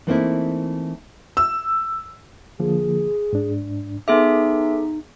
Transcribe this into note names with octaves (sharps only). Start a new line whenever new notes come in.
E3 A3 A#3 C4 D#4 E4
E6
D3 F3 A#3 G#4
G#2 D4
B3 D#4 G#4 A4 E5 D6